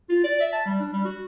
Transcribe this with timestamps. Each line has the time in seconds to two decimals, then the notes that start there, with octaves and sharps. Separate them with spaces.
0.09 F4
0.24 D5
0.40 E5
0.53 A5
0.66 G3
0.80 D4
0.93 G3
1.05 F#4